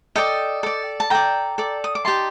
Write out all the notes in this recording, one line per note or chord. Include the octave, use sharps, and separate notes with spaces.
A4 D5 D#5 G5
A4 D5
A5
A4 D5 G5 A#5
A4 D5
D#6
D6
D#4 G4 D5 A5 C6